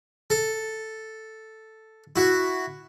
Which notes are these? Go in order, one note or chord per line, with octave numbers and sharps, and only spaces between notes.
A4
E4 F#4